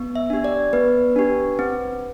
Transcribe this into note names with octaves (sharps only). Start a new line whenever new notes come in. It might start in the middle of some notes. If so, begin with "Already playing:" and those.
Already playing: B3
E5
D4 G4
D5
B3 B4
D4 G4
C4